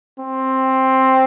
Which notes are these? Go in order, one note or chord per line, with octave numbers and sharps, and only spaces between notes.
C4